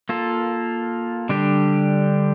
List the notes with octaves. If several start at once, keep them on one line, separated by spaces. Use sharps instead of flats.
A#3 F4 A4
D3 G3 D4 G4